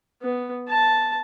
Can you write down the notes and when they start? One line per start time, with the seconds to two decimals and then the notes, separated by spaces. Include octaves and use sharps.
0.22 B3
0.68 A5